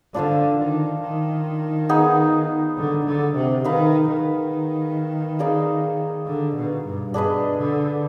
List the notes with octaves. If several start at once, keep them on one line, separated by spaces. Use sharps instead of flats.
D3 D4 F4 C5 F5
D#3
D#3
B3 D#4 G#4
D3
D3
C3
D#3 D#4 B4 F5
D#3
D#4 G#4 D5 F5
D3
B2
G2
B2 D4 G#4 B4 D#5
D3